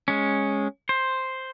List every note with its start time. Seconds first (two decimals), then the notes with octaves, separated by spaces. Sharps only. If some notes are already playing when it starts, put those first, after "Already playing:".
0.08 G#3 C#4
0.89 C5